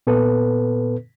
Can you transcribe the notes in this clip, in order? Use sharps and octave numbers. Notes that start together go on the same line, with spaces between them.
A#2 B3 A4 B4